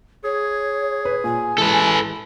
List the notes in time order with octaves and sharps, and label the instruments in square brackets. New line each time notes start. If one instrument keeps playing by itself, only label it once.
[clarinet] G#4 [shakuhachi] C#5
[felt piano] B4
[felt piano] A#2 [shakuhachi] G#5
[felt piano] E3 G#3 [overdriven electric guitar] A4 B4